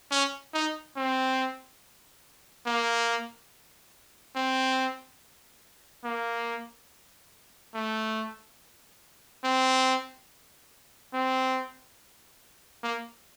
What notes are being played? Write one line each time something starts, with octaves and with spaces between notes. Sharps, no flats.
C#4
D#4
C4
A#3
C4
A#3
A3
C4
C4
A#3